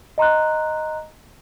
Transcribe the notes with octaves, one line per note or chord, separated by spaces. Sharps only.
D#5 A#5 C6 F#6